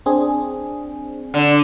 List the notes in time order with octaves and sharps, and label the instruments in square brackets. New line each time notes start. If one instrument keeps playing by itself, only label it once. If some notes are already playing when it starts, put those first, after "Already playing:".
[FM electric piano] C4 D4 G#4
[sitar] D3